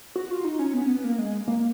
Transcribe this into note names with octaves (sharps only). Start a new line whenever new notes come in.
F#4
F4
D#4
C#4
B3
C#4
B3
A#3
G#3
A#3